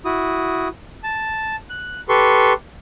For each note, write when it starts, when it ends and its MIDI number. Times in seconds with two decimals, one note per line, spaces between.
0.05 0.68 64
0.05 0.68 66
0.05 0.68 87
1.04 1.56 81
1.70 2.01 90
2.09 2.53 67
2.09 2.53 69
2.09 2.53 71
2.09 2.53 84
2.09 2.53 85